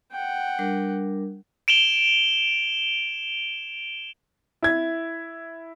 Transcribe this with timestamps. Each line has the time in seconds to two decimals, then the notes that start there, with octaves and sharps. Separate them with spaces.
0.12 F#5 G5
0.59 G3 D4 A#4
1.68 D7 E7 F7 G7
4.62 E4 G#6